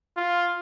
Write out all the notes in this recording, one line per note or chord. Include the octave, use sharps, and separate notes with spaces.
F4